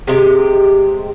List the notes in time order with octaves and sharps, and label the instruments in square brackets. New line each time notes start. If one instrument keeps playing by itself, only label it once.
[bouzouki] C3 G#3 G4